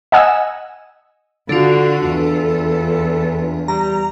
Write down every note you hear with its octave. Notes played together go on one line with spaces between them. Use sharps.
D#5 F#5 G#5 E6
D3 D4 F4 F#4 A4
E2
G3 A#5